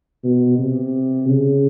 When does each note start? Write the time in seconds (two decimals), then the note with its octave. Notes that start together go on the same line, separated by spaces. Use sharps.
0.24 B2
0.59 C3
1.29 C#3